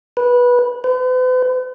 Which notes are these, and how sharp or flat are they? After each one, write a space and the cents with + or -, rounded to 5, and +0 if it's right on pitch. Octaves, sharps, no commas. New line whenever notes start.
B4 -15
B4 +45